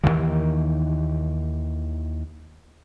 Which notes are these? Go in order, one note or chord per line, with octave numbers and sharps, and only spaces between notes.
D#2 C3 D#3 E3